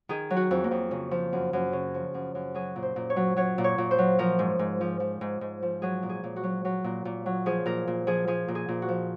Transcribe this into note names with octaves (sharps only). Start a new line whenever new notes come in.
D#3 G#4
F#3
F#4
F2
A#3
F2
C#3 A#3
F3
F#2
F#2
C#3
F3
F#2
F#2
F#3 G#4
A#2
C5
A#2
C#5
F#3
F#3 C#5
A#2
C#5
A#2
C5
F#3
F3 A#4
G#2
G#2
F3
F3
G#2
G#2
F3
F#3 G#4
A#2
G#4
A#2
F#4
F#3
F#3
A#2
A#2
F#3
F3 G#4
A#2 A#4
A#2
F3 G#4
F3 G#4
A#2
G#4
A#2
F#4
F3